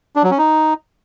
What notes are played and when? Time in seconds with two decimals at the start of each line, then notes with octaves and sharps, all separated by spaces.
0.16 D4
0.23 F#3
0.31 C#4
0.38 D#4